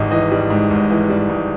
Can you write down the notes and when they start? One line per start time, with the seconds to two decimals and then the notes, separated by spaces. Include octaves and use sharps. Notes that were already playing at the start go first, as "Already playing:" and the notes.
Already playing: G#1 G#2 E3 G3 D#5
0.11 E3 D#5
0.32 G3
0.50 G#2
0.71 G#1
0.90 E3
1.10 G3
1.30 G#2